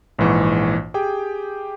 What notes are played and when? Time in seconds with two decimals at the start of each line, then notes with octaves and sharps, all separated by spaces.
0.19 A#1 G#2 E3 C#6
0.94 G4 G#4 G5